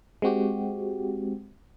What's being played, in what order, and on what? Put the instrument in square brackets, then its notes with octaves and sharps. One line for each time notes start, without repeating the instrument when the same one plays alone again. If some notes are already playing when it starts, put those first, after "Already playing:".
[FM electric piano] G#3 C4 F#4 G4